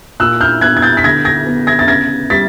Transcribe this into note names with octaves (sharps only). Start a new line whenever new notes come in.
A#2 E6 F#6
F6 G6
B3 F#6 G#6
G#6
G6 A6
B6
D3 G#6 A#6
G#6 A#6
B3
G#6 A#6
A6
C#3 G#6 A#6
G3 A6 B6